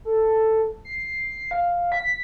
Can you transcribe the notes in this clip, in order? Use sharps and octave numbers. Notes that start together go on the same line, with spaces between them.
A4
C7
F5
B6